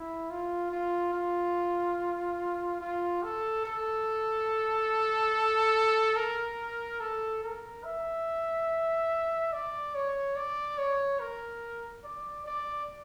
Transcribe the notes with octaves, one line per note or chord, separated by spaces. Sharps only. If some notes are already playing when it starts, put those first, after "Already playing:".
Already playing: E4
F4
F4
F4
F4
A4
A4
A#4
A4
A#4
E5
D5
C#5
D5
C#5
A#4
D5
D5